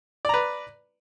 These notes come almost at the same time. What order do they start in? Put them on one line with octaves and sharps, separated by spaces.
D5 A#5 B4